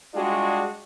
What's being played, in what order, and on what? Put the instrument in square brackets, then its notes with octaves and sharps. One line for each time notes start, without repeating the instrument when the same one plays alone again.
[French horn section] G3 G#3 D4 F4 F#4 G#4